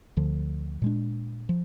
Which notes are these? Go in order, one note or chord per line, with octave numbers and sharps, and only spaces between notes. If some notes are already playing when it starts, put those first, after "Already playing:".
D2 D3 F3
A#2 G#3 D4
F3